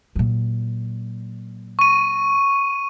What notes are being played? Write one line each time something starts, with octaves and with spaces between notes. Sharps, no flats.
A#2 F#3
C#6 D#7